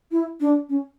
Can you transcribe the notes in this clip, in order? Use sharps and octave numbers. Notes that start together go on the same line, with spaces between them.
E4
D4
C#4